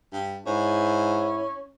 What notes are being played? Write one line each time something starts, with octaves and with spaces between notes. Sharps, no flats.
G2
G#2 C#4 E4